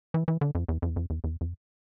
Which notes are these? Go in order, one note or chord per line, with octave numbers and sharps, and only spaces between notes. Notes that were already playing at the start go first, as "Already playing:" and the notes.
E3
E3
D3
F2
E2
F2
E2
F2
E2
E2
F2